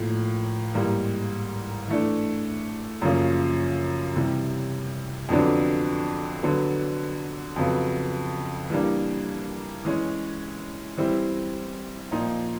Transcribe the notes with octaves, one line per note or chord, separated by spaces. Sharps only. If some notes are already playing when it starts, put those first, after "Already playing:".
Already playing: A2 F3 A#3
G#2 E3 G3 A#3
E3 A3 D4
F#2 C#3 F3 A#3 C#4
C3 E3 G3
F2 D3 F#3 B3 D4
D3 F#3 B3
F2 C#3 F#3 B3
E3 G3 A#3 D4
E3 G#3 C#4
E3 G3 C4 E4
A#2 F3 A#3 D#4